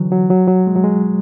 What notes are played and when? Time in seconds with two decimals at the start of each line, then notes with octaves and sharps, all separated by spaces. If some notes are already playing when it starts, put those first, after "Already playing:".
Already playing: D3 E3 F#3
0.12 F#3
0.30 F#3
0.48 F#3
0.67 G#3
0.76 F#3
0.84 G#3